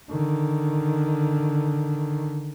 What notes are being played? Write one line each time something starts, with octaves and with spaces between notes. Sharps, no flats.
D3 D#3